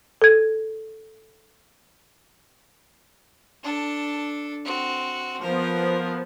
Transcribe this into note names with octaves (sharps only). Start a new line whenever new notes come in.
A4 G#6
D4 A4
C4 F#4
F3 B3 A#4